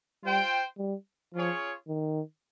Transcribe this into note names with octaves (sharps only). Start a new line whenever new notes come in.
G3 F4 C5 G5
G3
F3 C#4 F4 G#4 C#5
D#3